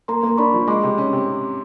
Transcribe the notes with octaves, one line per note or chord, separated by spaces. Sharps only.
A#3 A#5 C6
A#3
D4 B5 C#6
F3
G#3 C6 D6
C3
C#4
C3